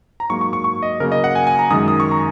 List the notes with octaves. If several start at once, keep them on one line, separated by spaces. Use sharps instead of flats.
A#5
G#2 F#3 A#3 C#6
C#6
C#6
C#6
D#5
C#3 F#3 A#3 A#4
D#5
F#5
G#5
G#5
A#5
F#2 D#3 G#3 D#6
D#6
C#6
A#5